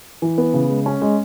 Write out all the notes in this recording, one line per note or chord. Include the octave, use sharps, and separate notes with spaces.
E3
B3
C#3
G#3
C#4
G#3